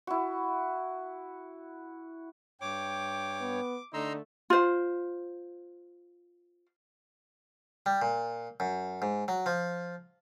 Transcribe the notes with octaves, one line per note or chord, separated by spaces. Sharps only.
E4 F#4
G2 C#5 G5 D6
B3
D3 A3 D#4 A#5 C6 E6
F4 C5
G3
A#2
F#2
G#2
F#3
F3